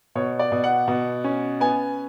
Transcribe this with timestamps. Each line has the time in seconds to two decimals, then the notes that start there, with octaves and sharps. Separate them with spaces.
0.15 B2 C#5
0.39 D5
0.52 B2
0.64 F#5
0.88 B2
1.24 C#4
1.60 B3 G#5